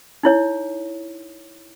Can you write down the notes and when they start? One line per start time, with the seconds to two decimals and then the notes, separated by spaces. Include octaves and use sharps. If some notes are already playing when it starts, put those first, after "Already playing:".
0.23 D#4 E4 C#5